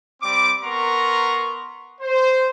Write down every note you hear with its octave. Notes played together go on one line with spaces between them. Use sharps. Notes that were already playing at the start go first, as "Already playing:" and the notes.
G3 C4 D6
B3 A#4 A#5 C6 C#6
C5